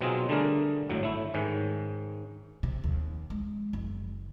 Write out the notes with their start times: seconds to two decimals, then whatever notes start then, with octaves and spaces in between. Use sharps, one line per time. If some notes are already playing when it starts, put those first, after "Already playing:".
0.01 B2 F#3 C4 D#4 F4 G#4
0.29 D3 G3 A3 D4 G#4 A#4
0.89 G#1 A2 F#3
1.03 A3 E4
1.34 G#2 D#3 C#4
2.63 C3
2.84 D#2
3.30 G#3
3.73 F#1